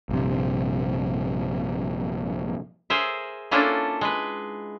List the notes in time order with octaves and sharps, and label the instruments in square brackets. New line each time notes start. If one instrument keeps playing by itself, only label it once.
[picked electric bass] A#1 G2 C3
[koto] G#4 A#4 C5 E5
A#3 C#4 D4 E4 F4 A4
G#3 B4